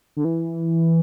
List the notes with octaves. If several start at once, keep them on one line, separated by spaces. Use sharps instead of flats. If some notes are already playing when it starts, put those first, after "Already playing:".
D3
E3